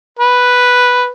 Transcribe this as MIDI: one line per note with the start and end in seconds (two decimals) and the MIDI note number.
0.19 1.11 71